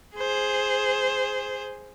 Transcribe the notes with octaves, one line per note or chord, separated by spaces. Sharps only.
G#4 C5